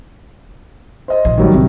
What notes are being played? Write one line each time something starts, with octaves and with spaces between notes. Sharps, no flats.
C5 D#5
A#1 D4
D#3 F#3 G3
A2 C3